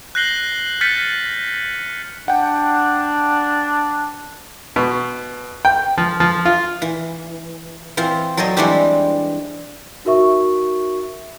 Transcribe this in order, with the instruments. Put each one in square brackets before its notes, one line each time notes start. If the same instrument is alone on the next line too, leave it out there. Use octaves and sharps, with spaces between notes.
[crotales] F#6 G6 A#6 C7 F#7 G7
F6 G6 A6 B6 C#7 D#7
[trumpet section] D4 [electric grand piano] F#5 G5
[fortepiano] B2
G5
F3
F3
F4
[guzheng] E3
E3 C4 F4
F#3 A4 C5 C#5 D#5
E3 G3 G#3 C4 D4 G4
[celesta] D#4 F#4 A#4 E5 C#6